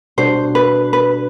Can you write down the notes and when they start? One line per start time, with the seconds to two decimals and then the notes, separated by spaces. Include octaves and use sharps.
0.18 B2 G3 D4 F#4 C5
0.55 B4
0.93 B4